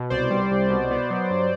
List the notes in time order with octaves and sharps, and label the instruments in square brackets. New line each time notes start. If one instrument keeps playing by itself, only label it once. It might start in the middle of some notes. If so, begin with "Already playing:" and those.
Already playing: [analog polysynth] B2
C2 C5 D5
G3
C2
B2
B3
F#3
G2